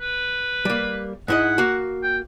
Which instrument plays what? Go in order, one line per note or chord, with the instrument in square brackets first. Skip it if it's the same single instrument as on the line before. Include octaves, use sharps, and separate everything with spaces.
[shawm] B4
[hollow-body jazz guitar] G3 A#3
[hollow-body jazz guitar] G#2 E4 D#5 [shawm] F#5
[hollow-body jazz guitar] A#3 F#4
[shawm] G5